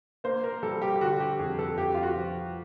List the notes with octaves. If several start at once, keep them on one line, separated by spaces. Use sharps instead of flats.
A#3 C5
A#4
G3 A4
G4
G4
D3 F#4
G4
F2 G#4
A4
F2 G4
F4
F#4
F3